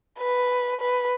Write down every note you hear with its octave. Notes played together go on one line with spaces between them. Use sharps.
B4
B4